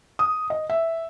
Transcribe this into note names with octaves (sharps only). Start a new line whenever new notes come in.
D#6
D#5
E5